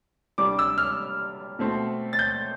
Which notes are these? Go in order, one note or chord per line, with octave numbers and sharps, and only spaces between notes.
C3 G3 D4 D6
E6
F6
B2 A3 C4
A6
G6